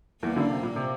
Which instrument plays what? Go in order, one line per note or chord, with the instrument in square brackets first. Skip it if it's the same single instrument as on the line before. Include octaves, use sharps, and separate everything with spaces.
[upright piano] E2 E3 [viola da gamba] A#3
[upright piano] D2 D3
C3
A#2
C3